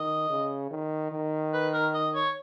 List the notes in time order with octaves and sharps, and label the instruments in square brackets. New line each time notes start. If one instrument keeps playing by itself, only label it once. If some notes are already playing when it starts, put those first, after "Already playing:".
Already playing: [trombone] D#3 [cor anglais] D#5
[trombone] C#3
D#3
D#3
[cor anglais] B4
A#4
D#5
C#5